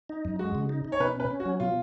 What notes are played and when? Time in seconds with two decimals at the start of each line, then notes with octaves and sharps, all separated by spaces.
0.09 D#4
0.25 F#2
0.39 G#3 F#4
0.55 C#3
0.69 D#4
0.85 D#4
0.92 C#5
1.00 B2 B4
1.15 C#4 B4
1.30 C#4
1.40 F#4
1.45 F#3
1.60 B2 F4